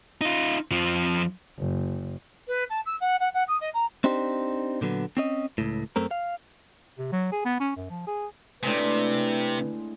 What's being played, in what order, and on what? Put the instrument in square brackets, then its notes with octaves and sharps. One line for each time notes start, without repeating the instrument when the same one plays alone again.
[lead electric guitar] D#4 F4
F2 F3
[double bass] F#1
[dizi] B4
A5
E6
F#5
F#5
F#5
D#6
D#5
A#5
[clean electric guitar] C4 D4 D#4 G4 C5
A#2 D3 F#3 B3
C4 C#4 D#5
C#2 A2
F#2 A3 C4 A#4
F5
[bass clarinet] C3
F#3
G#4
B3
C#4
F#2
F3
G#4
[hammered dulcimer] A2 G#3 [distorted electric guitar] C3 [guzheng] C4 D4 [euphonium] B4